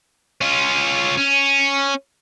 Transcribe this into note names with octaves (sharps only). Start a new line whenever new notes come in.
C#4 F4
C#4